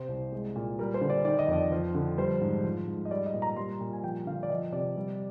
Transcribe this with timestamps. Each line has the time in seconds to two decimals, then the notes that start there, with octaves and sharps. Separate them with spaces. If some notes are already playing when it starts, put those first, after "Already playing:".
Already playing: C3 C5
0.09 C2
0.32 G#3
0.56 A#2
0.79 G3 A#4
0.94 C5
1.01 D3
1.10 D5
1.25 D#3 D5
1.39 D#5
1.48 F2 D5
1.72 F3
1.95 D3
2.18 G3 C5
2.41 G#2
2.64 F3
2.87 G#2
3.05 D#5
3.11 G3 D5
3.26 D#5
3.33 A#2
3.42 A#5
3.57 G3 C6
3.80 A#2
3.93 G#5
4.03 F3 G5
4.26 D3 F5
4.43 D5
4.49 F3 D#5
4.72 C3 D5
4.97 G3